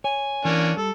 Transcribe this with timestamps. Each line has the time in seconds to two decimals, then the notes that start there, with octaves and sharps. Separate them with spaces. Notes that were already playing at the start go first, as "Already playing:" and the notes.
0.04 C#5 G#5
0.45 E3 A#3 C#4 D4
0.77 G3 A4